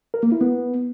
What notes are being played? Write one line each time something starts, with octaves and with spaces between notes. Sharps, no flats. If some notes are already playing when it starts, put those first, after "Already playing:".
A#4
A#3
E4
B3